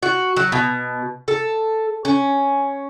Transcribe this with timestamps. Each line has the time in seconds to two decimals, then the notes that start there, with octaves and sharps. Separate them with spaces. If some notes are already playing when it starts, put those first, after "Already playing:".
0.03 F#4
0.36 F#3
0.52 B2
1.28 A4
2.05 C#4